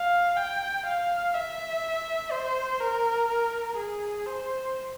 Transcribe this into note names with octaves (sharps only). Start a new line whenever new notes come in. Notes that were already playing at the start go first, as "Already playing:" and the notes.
Already playing: F5
G5
F5
E5
C5
A#4
A#4
G#4
C5